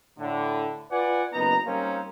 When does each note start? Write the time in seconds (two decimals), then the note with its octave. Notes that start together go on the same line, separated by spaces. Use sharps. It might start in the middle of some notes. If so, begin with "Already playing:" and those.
0.19 A2 D3
0.92 F4 B4 D5 F#5 G#5
1.33 F#1 B3 D#4 A#5
1.67 G3 A#3 C4 C#4 D#4